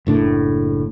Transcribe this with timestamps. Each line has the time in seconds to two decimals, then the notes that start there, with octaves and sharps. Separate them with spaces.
0.07 F#1 A2 D4